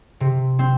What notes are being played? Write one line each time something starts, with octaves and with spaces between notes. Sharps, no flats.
C3
C4